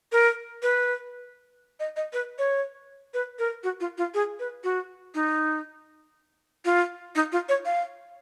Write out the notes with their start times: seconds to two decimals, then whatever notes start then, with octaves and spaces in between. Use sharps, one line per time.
0.12 A#4
0.63 B4
1.80 D#5
1.96 D#5
2.13 B4
2.38 C#5
3.14 B4
3.39 A#4
3.64 F#4
3.80 F4
3.98 F4
4.14 G#4
4.40 B4
4.64 F#4
5.15 D#4
6.65 F4
7.15 D#4
7.32 F4
7.49 C#5
7.65 F5